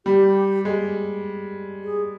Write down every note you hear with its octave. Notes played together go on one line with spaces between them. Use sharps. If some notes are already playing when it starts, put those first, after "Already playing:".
G3 G4
G#3
G#4